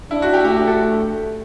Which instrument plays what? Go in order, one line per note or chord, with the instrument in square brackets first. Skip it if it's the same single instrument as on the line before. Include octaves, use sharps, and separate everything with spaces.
[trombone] D4 [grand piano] E4
[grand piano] F#4
G4
[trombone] A3 [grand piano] G4
[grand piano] G4
A4